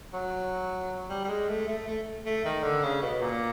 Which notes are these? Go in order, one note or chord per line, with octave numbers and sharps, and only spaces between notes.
F#3
G3
G3
G#3
A3
A3
A3
A3
D#3
D3
C#3
B2
A#2